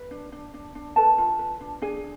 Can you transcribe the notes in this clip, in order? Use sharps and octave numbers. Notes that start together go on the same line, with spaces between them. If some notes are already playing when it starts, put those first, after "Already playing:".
Already playing: B4
D4
D4
D4
D4
A4 B4 A5
F4
B4
D4
D4 G#4 G#5